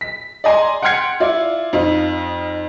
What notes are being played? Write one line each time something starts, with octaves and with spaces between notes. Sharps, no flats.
B6
D5 D#5 G#5 A#5 C6
F#5 G5 C6 F6 G#6 C#7
E4 F4 D5
F2 D#4 F4